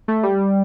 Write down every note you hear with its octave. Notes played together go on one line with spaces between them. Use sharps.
A3
G3